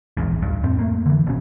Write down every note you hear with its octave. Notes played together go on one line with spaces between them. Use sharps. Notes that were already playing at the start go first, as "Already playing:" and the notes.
E1 A#1 E2 G#2
D1 G#1 G2
F2 A2 C4
A3 A#3
D3 E3
A1 B2 C#4